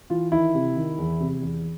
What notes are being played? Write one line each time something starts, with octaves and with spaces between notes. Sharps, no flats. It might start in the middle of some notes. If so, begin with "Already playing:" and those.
E3 F4
D#3 E4
C3
D#3
E2
C3
E2